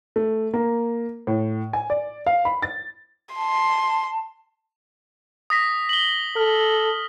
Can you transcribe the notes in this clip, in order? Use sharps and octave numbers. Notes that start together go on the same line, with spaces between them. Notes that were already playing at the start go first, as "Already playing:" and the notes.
A3
A#3
A2
G#5
D5
F5
B5
A6
A5 C6
D#6 A#6 B6
F#7 G7
A4 F6